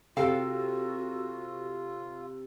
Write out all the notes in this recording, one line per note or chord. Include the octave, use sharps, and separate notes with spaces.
C3 F4 F#4 A4 F5 G5